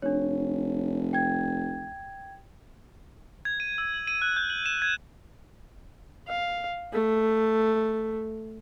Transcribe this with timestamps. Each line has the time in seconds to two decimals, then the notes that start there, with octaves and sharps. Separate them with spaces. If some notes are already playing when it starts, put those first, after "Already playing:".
0.02 F1 D4 C#5
1.13 G5 G#6
3.45 G#6
3.60 D#7
3.78 E6
3.94 F#7
4.07 D#7
4.22 F#6
4.36 G6
4.50 F#7
4.66 E7
4.82 G#6
6.28 F5
6.93 A3